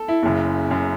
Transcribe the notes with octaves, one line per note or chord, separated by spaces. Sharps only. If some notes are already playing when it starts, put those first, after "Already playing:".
Already playing: A4
E4
F#1 F#2 C#3
F#2 C#3